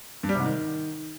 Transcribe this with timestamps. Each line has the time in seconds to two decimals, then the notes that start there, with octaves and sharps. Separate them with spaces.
0.23 G2
0.29 G3
0.35 C3
0.40 G#2
0.46 D#3